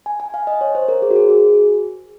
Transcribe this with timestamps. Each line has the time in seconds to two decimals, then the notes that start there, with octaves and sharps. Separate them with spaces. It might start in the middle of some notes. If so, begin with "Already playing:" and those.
0.06 G#5
0.20 G#5
0.34 F5
0.47 D#5
0.61 C#5
0.75 C5
0.88 A#4
1.02 G#4
1.11 F#4
1.16 G#4
1.29 G#4